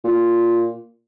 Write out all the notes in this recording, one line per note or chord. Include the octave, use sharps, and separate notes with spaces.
A#2